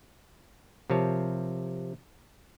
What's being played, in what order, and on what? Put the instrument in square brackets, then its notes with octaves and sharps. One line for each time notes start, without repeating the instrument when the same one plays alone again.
[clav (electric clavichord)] C3 F3 A#4 C#5 A5